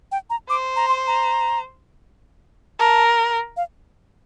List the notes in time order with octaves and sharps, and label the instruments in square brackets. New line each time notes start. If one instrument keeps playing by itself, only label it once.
[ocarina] G5
A#5
[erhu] C5 [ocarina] D6
[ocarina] A#5
C6
A#5
[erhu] A#4 [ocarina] A5
[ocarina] F5